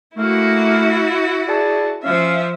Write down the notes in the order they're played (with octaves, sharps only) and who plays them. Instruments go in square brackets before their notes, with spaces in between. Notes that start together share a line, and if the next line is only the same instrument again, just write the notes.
[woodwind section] A3 A#3 [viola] E4 F#4
[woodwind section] G#4 D5 A5
[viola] F3 E5 [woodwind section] C#4 F5